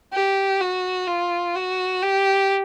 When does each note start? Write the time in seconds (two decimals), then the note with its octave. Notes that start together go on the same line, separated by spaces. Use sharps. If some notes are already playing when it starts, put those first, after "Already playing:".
0.12 G4
0.60 F#4
1.07 F4
1.55 F#4
2.02 G4